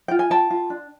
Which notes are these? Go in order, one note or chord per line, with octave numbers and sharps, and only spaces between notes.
F4 G5
G#5
F4 G5 A5
F4
D4